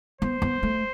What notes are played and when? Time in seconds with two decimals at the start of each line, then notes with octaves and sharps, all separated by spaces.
0.21 B3 C5
0.42 B3
0.63 A3